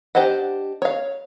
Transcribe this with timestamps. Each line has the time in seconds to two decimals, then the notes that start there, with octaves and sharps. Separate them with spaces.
0.15 D4 G4 C5 D#5 F#5
0.82 C#5 F5